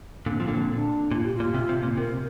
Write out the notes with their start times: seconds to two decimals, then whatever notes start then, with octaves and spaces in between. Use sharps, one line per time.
0.26 A#2 D3 C4
0.40 F3
0.47 A#2 D3
0.69 D4
1.11 A#2 F4
1.24 G4
1.35 F4
1.40 A#2
1.54 C3
1.69 C3
1.83 A#2
1.97 C3 A#4